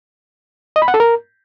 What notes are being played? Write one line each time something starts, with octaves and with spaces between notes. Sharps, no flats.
D#5
B5
F#5
A4
A#4